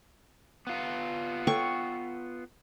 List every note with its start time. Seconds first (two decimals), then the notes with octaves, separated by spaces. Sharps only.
0.67 B3 F4
1.47 A4 C#5 G5 C#6